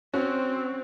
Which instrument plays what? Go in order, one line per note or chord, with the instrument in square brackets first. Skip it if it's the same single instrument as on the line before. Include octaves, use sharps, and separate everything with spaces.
[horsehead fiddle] C4 [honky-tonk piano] C#4 F#4